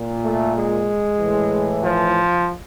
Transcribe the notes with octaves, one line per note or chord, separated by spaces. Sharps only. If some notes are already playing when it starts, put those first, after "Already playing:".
Already playing: A#2
A3
G#3
A2 E3
F3